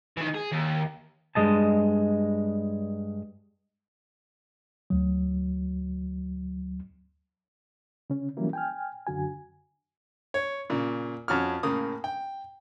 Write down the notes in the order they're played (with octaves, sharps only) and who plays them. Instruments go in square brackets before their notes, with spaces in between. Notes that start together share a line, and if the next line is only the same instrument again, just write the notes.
[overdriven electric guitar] D#3 E3
G#4
D#2
[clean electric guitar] G2 E3 G#3 D#5 A5
[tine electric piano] D2 F#3
[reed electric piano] C#3 C#4
E3 F#3 G3 A#3 C#4 E4
G5 G#5 F6
F#2 D3 F#4 G#5
[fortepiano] C#5
A#2 C#3
F2 C#4 F#4 F6
A2 C#3 A#3 D#6
G5